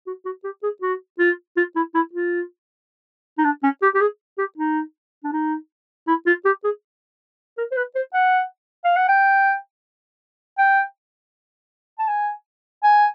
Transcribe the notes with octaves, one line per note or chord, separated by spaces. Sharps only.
F#4
F#4
G4
G#4
F#4
F4
F4
E4
E4
F4
D#4
D4
C#4
G4
G4
G#4
G4
D#4
D4
D#4
E4
F4
G4
G#4
A#4
C5
B4
C5
F#5
F5
F#5
G5
G5
A5
G#5
G#5